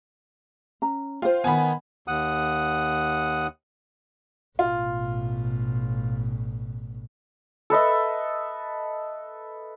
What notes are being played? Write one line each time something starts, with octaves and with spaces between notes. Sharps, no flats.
C#4 A#5
F4 C5 G5
D#3 B3 G#5 B5
D#2 F#5 D#6
A1 B2 F4
A4 B4 D#5 E5